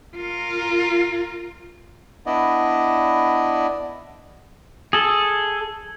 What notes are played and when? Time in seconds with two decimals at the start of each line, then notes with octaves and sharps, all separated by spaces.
0.17 F4 A#4
2.26 B3 D4 E4 D5 D#5
4.93 G#4 A4